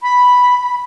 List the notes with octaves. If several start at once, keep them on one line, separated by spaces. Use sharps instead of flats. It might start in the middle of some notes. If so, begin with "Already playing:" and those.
B5